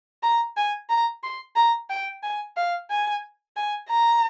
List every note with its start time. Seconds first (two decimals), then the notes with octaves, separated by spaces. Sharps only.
0.23 A#5
0.57 G#5
0.89 A#5
1.23 C6
1.56 A#5
1.90 G5
2.23 G#5
2.56 F5
2.90 G#5
3.56 G#5
3.89 A#5